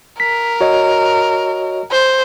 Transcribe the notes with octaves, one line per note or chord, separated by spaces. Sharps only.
A#4 B6
F#4 C#5 D#5
C5